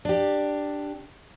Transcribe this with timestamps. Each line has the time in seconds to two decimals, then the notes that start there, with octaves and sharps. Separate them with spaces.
0.05 D4 G4